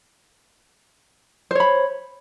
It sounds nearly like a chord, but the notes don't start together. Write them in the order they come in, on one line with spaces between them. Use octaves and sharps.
C5 C#5 B5